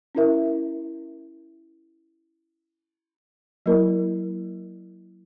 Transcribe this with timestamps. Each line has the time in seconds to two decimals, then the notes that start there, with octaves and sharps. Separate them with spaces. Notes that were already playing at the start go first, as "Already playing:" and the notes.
0.15 C#4 E4 A#4 E5
3.66 F#3 A#3 E4 A#4 D5